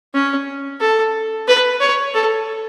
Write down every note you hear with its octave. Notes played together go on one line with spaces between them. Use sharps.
C#4
A4
B4
C#5
A4